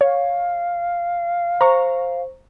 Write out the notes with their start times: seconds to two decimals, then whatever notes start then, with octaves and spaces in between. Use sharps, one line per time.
0.01 C#5 F5
1.61 C5 A#5 C#6